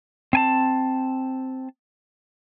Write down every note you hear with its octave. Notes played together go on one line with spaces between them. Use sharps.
C4 G#5 A5